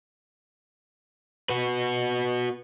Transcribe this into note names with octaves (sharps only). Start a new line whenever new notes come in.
F#4 B4